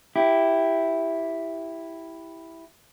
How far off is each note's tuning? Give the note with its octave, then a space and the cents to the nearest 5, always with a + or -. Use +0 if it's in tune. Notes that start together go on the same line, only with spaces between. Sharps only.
E4 +0 G4 +0